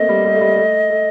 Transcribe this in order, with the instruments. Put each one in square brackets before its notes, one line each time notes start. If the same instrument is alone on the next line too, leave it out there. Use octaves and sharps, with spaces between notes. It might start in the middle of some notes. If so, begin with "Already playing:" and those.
Already playing: [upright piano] A3 A#3 C4 [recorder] D#5
[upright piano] G3
G3
A3
G3
A3
A3